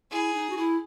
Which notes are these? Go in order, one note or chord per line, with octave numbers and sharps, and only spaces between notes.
E4 G#4
D#4
F#4
E4